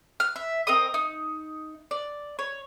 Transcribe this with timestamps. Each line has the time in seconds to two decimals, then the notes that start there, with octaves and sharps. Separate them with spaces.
0.20 F6
0.36 E5
0.67 C4 A#4 D#5 D#6
0.94 D#4
1.91 D5
2.39 C#5